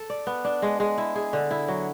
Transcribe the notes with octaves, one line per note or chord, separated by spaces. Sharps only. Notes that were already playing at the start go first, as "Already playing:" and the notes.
Already playing: A4
D5
B3
D4
G#3
G#3
E4
G#4
D3
E4
F#3